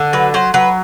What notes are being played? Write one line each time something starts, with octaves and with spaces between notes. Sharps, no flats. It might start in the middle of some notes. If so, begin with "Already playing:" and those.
Already playing: D3
F#3 B4
F#3 C5
F#3 B4